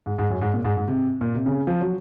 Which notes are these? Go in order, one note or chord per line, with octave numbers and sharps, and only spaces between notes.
G#2
G#2
F#2
G#2
A#2
G#2
G#2
C3
A#2
C3
C#3
F3
F#3